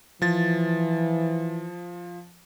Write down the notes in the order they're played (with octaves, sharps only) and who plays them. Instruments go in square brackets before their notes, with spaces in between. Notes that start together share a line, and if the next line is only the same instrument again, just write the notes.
[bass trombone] E3 [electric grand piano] F3 A6